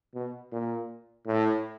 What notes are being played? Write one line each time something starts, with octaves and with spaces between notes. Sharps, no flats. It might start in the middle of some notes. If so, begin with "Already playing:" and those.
B2
A#2
A2